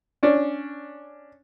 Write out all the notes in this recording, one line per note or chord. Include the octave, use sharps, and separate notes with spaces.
C#4 D4